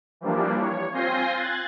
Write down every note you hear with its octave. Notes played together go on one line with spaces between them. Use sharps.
E3 F3 G3 A#3 D4
C#5
C4 F4 G#5 G6 A#6 C7
F#6 G#6 A6